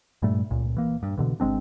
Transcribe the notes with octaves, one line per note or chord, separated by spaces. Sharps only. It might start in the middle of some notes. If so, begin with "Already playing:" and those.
G2 A#2 G3 A3
C#2 A#2
E3 A#3
G2
B2 D3 E3
G#1 G#3 C4 D4